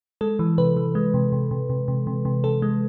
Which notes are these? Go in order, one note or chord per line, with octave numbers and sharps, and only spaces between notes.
G#3 A4
E3
C3 B4
E3
G#3
C3
C3
C3
C3
C3
C3
C3
C3 A4
G#3